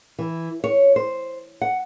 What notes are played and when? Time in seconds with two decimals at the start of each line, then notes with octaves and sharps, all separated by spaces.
0.19 E3
0.64 C#5
0.96 C5
1.61 F#5